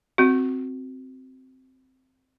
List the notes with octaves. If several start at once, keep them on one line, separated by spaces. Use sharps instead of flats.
C4 F#4